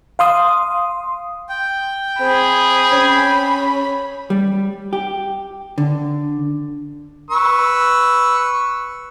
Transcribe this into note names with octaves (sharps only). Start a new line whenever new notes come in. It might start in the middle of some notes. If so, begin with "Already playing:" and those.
F5 C6 D#6
G5
C4 G#4 B5
C#4
G3
G4
D3
B4 C#6 E6